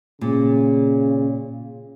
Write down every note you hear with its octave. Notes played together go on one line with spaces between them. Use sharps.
A#2 C#3